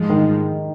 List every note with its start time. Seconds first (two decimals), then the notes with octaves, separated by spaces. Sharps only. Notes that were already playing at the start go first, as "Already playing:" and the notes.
Already playing: G#2 F3 G#3
0.10 D#3